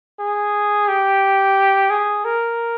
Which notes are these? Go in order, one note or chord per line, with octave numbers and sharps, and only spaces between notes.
G#4
G4
G#4
A#4